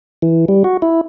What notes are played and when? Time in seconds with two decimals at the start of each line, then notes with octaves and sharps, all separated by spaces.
0.22 E3
0.48 G3
0.64 F#4
0.82 E4